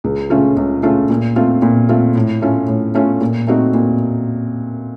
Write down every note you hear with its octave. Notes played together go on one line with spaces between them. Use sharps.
C#2
C#3 A3 C#4 F4
C#2
C#3 A3 C#4 F4
A#2
A3 C4 F4
A#2
A3 C4 F4
A2
A3 C#4 F4
A2
A3 C#4 F4
A#2
A3 C4 D#4 F#4
A#2